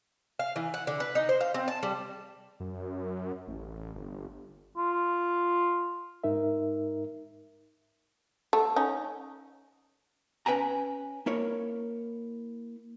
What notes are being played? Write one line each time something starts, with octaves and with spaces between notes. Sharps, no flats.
F5
E3
F#5
D3
B4
D#4
C5
F5
C4
A5
G3
F#2
A1
G1
F4
G#2 D#4 A#4 E5
A3
C#4 D#4
C#4 B4 G5 G#5 A#5
A#3 E4 A#4 C#5